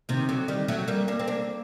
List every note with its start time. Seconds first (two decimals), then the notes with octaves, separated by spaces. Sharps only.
0.09 C3 D#3
0.29 D3 F#3
0.48 D#3 G3
0.68 F#3 A3
0.88 G3 A#3
1.08 A#3 D4
1.19 C4
1.28 A#3 D4